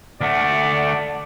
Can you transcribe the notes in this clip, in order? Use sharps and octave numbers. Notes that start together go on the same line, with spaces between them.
D2 A3 D5 F#5